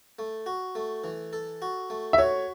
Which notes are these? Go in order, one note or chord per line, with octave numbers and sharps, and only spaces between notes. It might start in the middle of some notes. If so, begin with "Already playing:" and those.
A3
F#4
A3
E3
A4
F#4
A3
E5
F#4 C#5